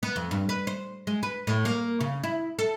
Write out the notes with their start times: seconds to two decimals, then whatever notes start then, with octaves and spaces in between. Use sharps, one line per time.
0.03 B3
0.16 F2
0.31 G2
0.49 B4
0.67 C5
1.07 G#3
1.23 B4
1.47 A2
1.65 A#3
2.00 C#3
2.23 E4
2.59 A4